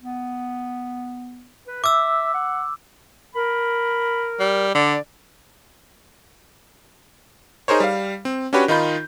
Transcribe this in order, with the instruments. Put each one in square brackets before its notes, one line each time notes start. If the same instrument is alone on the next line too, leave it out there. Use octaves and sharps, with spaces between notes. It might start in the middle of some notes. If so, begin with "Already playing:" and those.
[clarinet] B3
B4
[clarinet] E5 [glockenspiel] D6 E6
[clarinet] F#5
[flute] A#4 [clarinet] B5
[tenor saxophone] G3
[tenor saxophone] D3 [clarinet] D5
[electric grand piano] D#4 G#4 A#4 C5 C#5
G3 F5
C4
C#4 D4 F#4 G4 B4 C#5
D#3 D#4 F4 B5 G6